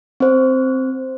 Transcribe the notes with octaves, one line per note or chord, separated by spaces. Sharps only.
C4 C5